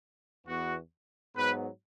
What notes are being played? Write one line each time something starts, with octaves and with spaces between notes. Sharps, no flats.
E2 E3 B3 F#4
G#2 F#3 B3 B4